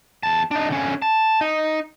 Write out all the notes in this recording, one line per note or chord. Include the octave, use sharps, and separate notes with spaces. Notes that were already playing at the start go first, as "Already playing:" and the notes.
E2 A5
D4 D#4
D3 C#4
A5
D#4